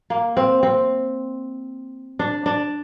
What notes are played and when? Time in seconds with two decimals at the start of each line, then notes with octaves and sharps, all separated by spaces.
0.10 A#3
0.37 C4
0.63 C4
2.19 D4
2.46 D4